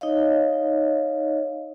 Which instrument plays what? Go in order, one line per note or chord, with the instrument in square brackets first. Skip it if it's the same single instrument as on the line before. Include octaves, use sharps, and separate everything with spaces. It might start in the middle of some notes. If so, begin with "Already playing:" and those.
[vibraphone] D#4 C#5 D#5 F5